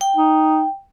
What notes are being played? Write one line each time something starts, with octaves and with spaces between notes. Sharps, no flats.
G5
D#4